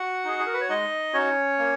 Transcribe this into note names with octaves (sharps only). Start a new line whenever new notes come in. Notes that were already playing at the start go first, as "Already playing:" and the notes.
Already playing: F#4 F#5
D#4 G#4
G#4
A#4
B4
C#5
G#3 D#4 D#5
C#4 D#4 F#4 C#5
A#3